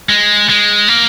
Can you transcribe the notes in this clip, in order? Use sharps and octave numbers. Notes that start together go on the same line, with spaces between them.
G#3
G#3
A#3